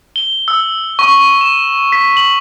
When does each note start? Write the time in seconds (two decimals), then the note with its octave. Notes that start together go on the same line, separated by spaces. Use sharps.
0.16 G7
0.48 E6
0.99 C#6
1.41 E7
1.92 B6
2.17 F#7